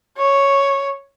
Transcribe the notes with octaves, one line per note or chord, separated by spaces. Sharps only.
C#5